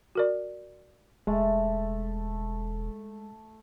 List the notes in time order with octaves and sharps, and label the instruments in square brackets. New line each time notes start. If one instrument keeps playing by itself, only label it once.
[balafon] F#4 A#4 D5
[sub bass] E1 [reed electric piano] G#3 [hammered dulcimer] A3